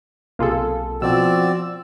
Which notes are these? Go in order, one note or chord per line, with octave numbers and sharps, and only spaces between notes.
B1 C3 A#3 F4 G#4 A4
B2 F3 C4 F#4 D5 E6